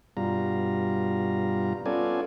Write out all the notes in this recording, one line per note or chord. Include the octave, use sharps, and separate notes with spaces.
G2 B2 G3 F4 A#5
B3 C#4 F4 A4 D5 G#5